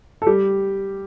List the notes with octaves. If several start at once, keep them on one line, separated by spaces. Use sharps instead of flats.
A4
G3 G4